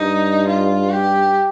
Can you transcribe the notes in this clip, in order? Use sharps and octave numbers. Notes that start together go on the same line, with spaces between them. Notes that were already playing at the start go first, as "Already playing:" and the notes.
Already playing: G2 D#4
F4
G4